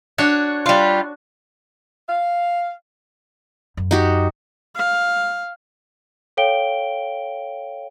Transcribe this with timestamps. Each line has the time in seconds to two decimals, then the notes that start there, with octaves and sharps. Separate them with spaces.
0.18 D4 F#4 C#5
0.66 G3 F4
2.09 F5
3.77 F#2
3.91 D#4 F#4 G4
4.76 F5
6.37 A4 C#5 F5 G5 D7 G7